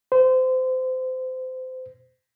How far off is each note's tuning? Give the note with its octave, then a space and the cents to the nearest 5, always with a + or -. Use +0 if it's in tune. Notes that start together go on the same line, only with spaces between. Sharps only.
C5 -25